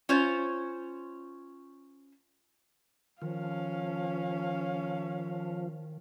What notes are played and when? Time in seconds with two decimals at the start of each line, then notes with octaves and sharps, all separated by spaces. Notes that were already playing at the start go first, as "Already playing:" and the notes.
0.09 C#4 F4 C5 C#5
3.22 D#3 F3 C#4 F5